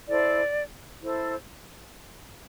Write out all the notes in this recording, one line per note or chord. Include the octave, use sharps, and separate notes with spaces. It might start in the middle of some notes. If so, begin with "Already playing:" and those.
E4 A4 C5 D5
E4 A4 C5